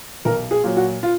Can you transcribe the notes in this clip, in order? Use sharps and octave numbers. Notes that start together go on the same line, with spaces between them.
B1 A#4
G#4
A#2 F#3
F#4
F4